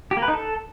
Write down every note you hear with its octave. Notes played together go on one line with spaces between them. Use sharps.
G4
A#3
B4
D#4
A4